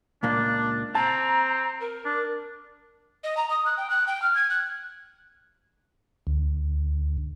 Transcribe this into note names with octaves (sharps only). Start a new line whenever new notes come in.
C#2 A#2 A#3 D4
C4 A5 A#5
A#4
D4
D#5
A#5
D#6
F#6
G5
F#6
G5
F6
G#6
F#6
D2